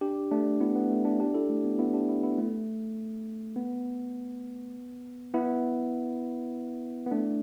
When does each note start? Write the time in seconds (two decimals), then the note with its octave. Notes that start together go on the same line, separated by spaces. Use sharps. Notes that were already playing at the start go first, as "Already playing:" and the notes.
0.01 D4 G4
0.31 A3 D4
0.60 B3 E4
0.76 B3
0.90 A3
1.05 A3 D4
1.20 D4 G4
1.34 E4 A4
1.49 A3
1.65 B3
1.79 B3 E4
1.94 D4 G4
2.09 B3 E4
2.23 B3 E4
2.38 A3
3.56 B3
5.34 B3 E4
7.06 B3
7.11 A3 D4